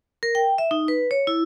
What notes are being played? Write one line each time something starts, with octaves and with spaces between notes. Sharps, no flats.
A#4
G5
E5
D#4
B4
C#5
E4